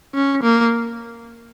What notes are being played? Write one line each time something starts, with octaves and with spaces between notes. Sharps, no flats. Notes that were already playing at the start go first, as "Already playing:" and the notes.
C#4
A#3